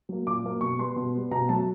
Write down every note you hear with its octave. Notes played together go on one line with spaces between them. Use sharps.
F#3 A#3
A#2 D6
F#3 A#3
B2 C#6
G3 B3 C6
B2
G3 B3
B2 A#5
F#3 A3 A5